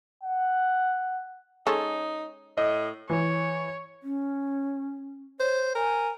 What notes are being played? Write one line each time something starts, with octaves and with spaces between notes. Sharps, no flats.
F#5
G#3 C#4 D#4 A4
A2 D#5
E3 C#5
C#4
C5 C#5
A#4 G#5